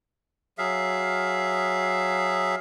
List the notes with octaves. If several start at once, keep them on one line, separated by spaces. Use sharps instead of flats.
F#3 G#4 E5 F5